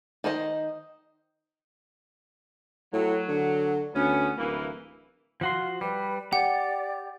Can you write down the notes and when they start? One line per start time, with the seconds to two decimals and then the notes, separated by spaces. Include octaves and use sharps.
0.24 D#3 D#4 C5 D#5
2.93 A2 F#3
3.28 D3
3.94 D2 B3 C#4
4.37 D1 E3 A#3
5.41 F3 F4 F#4 C6
5.81 G3 B4
6.33 G4 D5 F#5